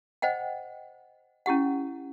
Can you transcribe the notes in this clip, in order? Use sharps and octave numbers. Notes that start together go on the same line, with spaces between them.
C5 D#5 F#5 G5
C#4 E4 G4 F#5